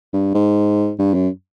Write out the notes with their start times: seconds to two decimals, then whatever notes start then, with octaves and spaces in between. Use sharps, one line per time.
0.13 G2
0.34 G#2
0.99 G2
1.14 F#2